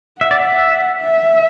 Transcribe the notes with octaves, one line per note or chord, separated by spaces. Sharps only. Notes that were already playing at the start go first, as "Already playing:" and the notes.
E5 F#5
D5
E5
E5